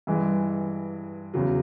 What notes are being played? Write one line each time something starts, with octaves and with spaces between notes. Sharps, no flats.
G2 E3 G#3
E2 C#3 F#3